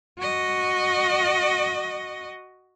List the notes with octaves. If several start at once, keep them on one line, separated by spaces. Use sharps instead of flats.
F#4 D#5